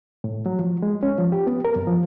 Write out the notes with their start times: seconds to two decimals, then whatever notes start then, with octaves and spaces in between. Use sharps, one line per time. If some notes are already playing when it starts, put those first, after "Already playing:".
0.24 A2
0.46 F#3
0.59 F3
0.82 G#3
1.03 C#4
1.18 F3
1.32 G4
1.47 B3
1.65 A#4
1.76 F#2
1.87 F3